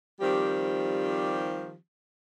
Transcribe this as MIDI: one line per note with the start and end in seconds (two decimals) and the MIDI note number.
0.20 1.74 51
0.20 1.74 53
0.20 1.74 55
0.20 1.74 60
0.20 1.74 67